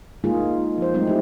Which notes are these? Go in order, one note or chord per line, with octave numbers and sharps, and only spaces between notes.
G#3 A#3 D#4 F4 G#4
F3 C5
F#3 G#3 A3 C4 D#4
E4 G4